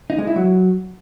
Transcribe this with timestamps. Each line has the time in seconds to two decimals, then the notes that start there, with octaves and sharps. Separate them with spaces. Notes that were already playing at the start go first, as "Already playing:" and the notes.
0.10 D#4
0.18 G#3
0.27 E4
0.36 F#3